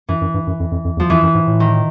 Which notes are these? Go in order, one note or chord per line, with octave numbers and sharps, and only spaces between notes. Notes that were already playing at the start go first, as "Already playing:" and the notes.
F#2 E3
F#2
G2
F#2
F2
F2
F2
E2
F3
F2 E3
F#2
G#2
A2
D#3